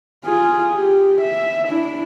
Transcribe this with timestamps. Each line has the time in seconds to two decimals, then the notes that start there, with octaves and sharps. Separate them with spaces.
0.25 F4 G#4
0.74 G4
1.22 E5
1.68 D4 E4